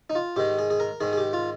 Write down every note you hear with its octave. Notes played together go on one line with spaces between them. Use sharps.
D#4
F4
G#2 D#3 G4
G#4
G#4
A#4
G#2 D#3 G#4
G#4
G4
F4